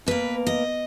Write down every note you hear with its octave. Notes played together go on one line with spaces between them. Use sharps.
B2 A#3 B4
D#5